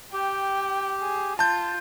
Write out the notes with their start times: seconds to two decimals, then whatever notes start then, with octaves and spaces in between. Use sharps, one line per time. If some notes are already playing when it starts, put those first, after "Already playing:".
0.13 G4 G5
1.02 G#4
1.39 F4 A5 G6